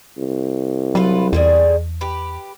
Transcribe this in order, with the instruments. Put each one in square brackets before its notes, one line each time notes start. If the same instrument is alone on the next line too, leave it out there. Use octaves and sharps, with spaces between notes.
[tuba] C2
[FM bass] F#3 [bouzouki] F4 A4 B4
[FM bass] E2 [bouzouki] D3 G3 G#4
[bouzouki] G4 B4